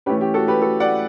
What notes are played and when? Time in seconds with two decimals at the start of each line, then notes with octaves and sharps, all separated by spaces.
0.06 C#4 G4 B4
0.09 E3 A3
0.21 G4
0.34 F#4 A4
0.48 G4 B4
0.61 F#4 A4
0.80 D5 F#5